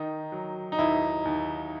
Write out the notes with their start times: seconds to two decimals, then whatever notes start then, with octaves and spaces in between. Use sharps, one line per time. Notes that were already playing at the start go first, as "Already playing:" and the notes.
Already playing: D#3 D#4
0.32 F#3
0.72 D#4
0.78 D#2 E4
1.25 D#2